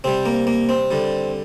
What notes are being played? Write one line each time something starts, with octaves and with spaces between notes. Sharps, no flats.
C3 G3 C4
A#3
A#3
C4
D3 G3